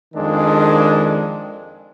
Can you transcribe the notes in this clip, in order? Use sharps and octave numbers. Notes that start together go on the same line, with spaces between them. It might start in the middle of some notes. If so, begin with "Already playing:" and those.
F2 D#3 G#3 D4